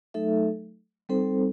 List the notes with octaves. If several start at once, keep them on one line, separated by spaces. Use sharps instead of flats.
F#3 A3 D#4 A4 E5
G3 C4 D#4 A4 C5